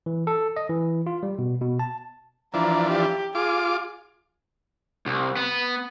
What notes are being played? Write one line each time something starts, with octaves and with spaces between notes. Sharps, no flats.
E3
A4
D#5
E3
F4
G3
B2
B2
A5
E3 F3 D4 A#5
G4
F4 G#4 D6
C2
B3